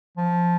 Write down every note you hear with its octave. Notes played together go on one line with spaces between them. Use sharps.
F3